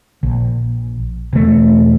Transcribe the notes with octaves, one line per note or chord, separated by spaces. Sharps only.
A#1
E1 A3